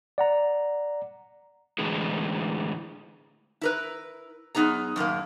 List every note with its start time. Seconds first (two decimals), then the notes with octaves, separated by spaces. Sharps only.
0.18 D5 F#5 A#5
1.78 A2 D3 E3 G#3
3.61 E4 A#4 B4
4.55 F#2 B3 D#4 G#4 A#5
4.96 F#2 A2 D#3 A#3